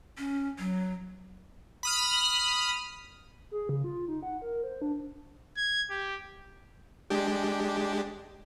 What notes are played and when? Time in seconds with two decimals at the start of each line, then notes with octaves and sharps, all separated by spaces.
0.18 C#4
0.59 F#3
1.83 B5 D#6 F6
3.51 G#4
3.69 C#3
3.84 F4
4.08 D#4
4.23 F#5
4.42 A#4
4.64 C5
4.82 D4
5.57 G#6
5.90 G4
7.10 G#3 D4 G4